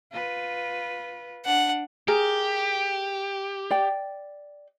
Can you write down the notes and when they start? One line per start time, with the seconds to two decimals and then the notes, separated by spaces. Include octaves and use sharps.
0.12 F4 B4
1.46 D4 F#5
2.08 G4 G#4 A#4
3.70 D5 G5